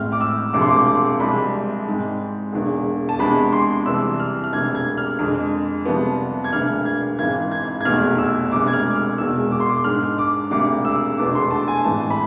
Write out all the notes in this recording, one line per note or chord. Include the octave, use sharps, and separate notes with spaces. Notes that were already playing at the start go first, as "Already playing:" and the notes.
Already playing: A1 A2 G#3 C4 F6
D6
E6
E1 D2 C3 F3 D6
C6
D6
D6
C2 C3 G#3 C4 B5
G#2 G#3 C4
E1 E2 D3
A5
E2 C3 G#3 D4 B5
C6
C2 C3 E3 E6
F6
F6
E1 D2 C3 G#6
G#6
F6
F2 D3 G#3
C2 C3 F3 B3
G#6
E1 D2 D3 F6
G#6
G#1 G#2 E3 G#3 C4 G#6
G#6
G#6
F1 E2 B2 F6
E6
E1 D2 C3 G#3 D6
G#6
F6
F6
E1 E2 B2 G#3 E6
D6
C6
D6
G#2 G#3 D4 F6
D6
E1 D2 C3 D6
E6
F1 E2 B2 B3 D4 D6
C6
A5
G#5
A1 G#2 E3 G#3 C4 A5
B5